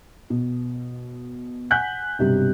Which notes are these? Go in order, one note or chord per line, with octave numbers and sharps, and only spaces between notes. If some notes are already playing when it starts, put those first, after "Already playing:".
B2
F#5 G#5 F#6 G6 B6
B1 G2 C3